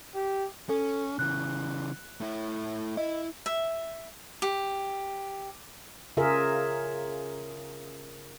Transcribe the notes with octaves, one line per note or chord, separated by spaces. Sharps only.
G4
C#4 A4
C#3 E3 F#6
A3 E4
E4 D#5
E5
G4
C#3 F4 G#4 A#4 E5